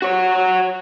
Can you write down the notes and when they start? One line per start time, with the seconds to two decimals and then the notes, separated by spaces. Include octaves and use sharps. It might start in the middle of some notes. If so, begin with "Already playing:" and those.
0.02 F#4 C#5